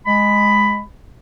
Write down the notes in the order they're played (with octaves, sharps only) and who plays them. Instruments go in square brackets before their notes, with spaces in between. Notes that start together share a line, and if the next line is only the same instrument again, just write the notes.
[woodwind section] G#3 B5